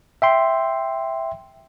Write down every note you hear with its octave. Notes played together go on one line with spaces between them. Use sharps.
E5 G5 C6